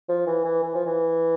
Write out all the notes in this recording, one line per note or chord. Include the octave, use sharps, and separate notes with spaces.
F3
E3
E3
E3
F3
E3